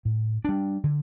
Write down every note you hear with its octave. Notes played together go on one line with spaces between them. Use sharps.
A2
G3 D4
D3